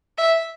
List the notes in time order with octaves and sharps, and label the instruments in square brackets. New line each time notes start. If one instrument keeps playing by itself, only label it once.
[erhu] E5